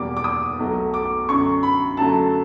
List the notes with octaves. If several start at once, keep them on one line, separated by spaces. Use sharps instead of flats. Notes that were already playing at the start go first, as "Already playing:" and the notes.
Already playing: E2 B2 G3 A#3 D6
D6
D#6
B1 B2 F#3 A3
D6
F#2 D3 F#3 C#6
B5
F#2 D3 F#3 A3 A5